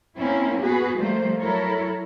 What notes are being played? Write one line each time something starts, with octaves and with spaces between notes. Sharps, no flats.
A#3 C4 C#4 E4 C#5
B3 F#4 G#4 B4
F3 G3 A3 A#3 C5
F#3 E4 A4 A#4 C#5